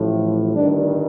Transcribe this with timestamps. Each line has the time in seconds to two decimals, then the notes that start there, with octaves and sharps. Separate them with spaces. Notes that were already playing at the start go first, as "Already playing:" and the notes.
Already playing: A1 A2 F3
0.55 G1 G2 D#3 G3 D4